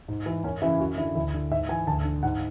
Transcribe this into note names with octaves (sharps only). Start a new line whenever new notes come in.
G#2
E3
F#2 C#4
C#3 E3 E4
F#2 F#4
D3 E4
D2 E4
D3
G#2 E5
E3 G#5
D2 A5
D3
G#2 F#5